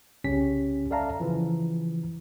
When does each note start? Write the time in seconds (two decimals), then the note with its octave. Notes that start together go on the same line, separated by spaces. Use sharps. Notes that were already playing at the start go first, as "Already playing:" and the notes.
0.24 C2 C#3 C#4 G4 B6
0.91 A4 D5 E5 F5 A5 A#5
1.20 C#3 E3 F3